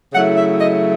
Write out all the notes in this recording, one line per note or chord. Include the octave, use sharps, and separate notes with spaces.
C#3 F#3 A3 E4 F#5
E5
D#5